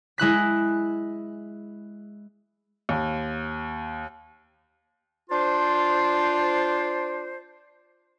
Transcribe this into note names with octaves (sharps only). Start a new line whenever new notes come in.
G#3 E4 F#6 B6
D#2
D4 F4 C5